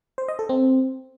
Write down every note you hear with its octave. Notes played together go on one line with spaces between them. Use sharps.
C5
D#5
A4
C4